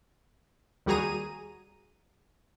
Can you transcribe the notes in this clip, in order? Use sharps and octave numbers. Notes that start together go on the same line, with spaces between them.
D#2 G3 F#4 G#4 A#5 D#7